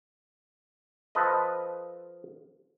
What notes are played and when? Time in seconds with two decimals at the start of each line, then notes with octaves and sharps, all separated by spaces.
1.15 F3 A4 B4 D#5